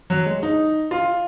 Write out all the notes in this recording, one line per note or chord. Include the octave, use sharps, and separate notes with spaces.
F#3
G#3
D#4
F4